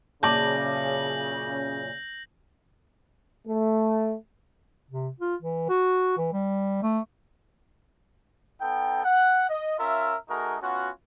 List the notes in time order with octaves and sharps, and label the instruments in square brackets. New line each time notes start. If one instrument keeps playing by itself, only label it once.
[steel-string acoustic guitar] F#2 A#2 [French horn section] C#3 [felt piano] A5 D6 [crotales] G6 A#6 F#7
[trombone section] A3
[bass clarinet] C3
F4
E3
F#4
E3
G3
A3
[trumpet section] B3 D#4 A4 G5
F#5
D#5
C#4 F4 A#4 E5
A3 D#4 F#4 G#4 A#4
B3 C#4 F4 F#4